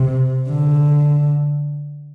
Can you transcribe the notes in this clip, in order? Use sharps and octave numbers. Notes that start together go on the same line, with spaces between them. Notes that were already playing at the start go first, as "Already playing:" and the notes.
Already playing: C3
D3